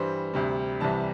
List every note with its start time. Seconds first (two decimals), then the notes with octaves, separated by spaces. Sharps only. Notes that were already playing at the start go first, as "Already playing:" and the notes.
Already playing: G2 E3 G3 C5
0.34 D2 C3 G3
0.80 C2 C3 E3 G3 A5